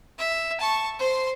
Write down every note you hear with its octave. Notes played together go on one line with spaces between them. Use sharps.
E5
A5 C#6
C5 C6